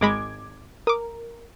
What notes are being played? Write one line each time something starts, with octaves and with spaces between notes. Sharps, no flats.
G#1 G#3 B5 D6 G#6
A#4 D6 D#6